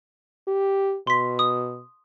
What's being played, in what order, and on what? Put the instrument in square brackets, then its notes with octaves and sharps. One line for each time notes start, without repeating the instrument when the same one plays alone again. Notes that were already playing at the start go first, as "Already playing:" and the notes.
[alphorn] G4
[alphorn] B2 [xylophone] C6 B6
[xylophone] D#6